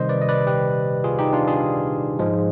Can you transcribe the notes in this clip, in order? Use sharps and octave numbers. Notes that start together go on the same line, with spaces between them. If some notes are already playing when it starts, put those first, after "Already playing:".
Already playing: C3 D#3 G3 C5 D#5
B4 D5
D#5
B4 D5
G4 B4
F4 G#4
D#4 G4
D4 F4
F4 G#4
G#2 F3 G#3